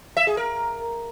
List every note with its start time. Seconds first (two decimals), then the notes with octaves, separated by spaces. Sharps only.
0.17 E5
0.27 G#4
0.37 A#4